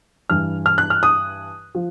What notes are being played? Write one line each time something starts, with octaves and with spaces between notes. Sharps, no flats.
G2 E3 F6
F6
F#6
F6
D#6
F3